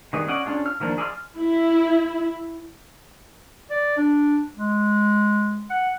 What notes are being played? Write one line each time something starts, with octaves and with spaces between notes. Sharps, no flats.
D#3 G3 B3 G#4
C#4 D5 D#5 F#5
C#4 D4 F4 G#4
F6
D#3 F3 A#3 D4
G#4 D5 E5 C6 F6
E4
D5
D4
G#3
F#5